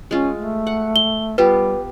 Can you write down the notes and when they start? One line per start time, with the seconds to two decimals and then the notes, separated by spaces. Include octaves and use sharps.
0.11 G#3 C#4 F4
0.35 A3
0.67 F#5
0.96 G7
1.38 G3 B3 F4 G4 B4